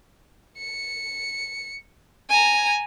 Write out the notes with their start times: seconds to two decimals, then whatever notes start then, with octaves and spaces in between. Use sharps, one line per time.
0.58 C#7
2.30 G#5 A#5